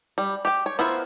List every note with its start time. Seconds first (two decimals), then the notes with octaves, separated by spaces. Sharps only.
0.18 G3
0.45 G4 G5
0.66 C#5
0.79 B3 E4 F4 A#4 C5